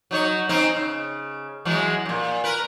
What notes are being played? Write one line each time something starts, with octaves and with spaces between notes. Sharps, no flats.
F#3 D#4 C#5
C4 C#4 D#4
C#3
E3 F#3 G#3
F#2 A#2
A#4 B4